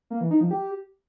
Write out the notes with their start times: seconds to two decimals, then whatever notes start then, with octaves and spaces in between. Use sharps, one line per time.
0.10 A#3
0.21 E3
0.31 D#4
0.41 F3
0.51 G4